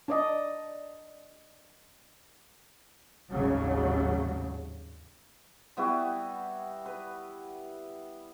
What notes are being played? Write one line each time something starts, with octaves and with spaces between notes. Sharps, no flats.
D4 D5 D#5
G#1 D#2 A2 C#3 F#3 G3
G3 B3 E4 F#4
B4